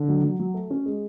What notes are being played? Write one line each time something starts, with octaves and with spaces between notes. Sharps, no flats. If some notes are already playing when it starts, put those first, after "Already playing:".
Already playing: D3
F#3
F#3
F#3
A3
C#4
G#3